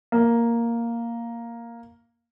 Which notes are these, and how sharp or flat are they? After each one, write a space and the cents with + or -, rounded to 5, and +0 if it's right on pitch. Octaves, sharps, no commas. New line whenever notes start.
A#3 +0